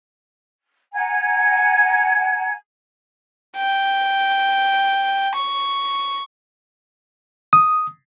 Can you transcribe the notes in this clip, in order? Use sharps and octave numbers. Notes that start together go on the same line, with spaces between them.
F#5 G#5 A#5 G#6
G5
C#6
D#6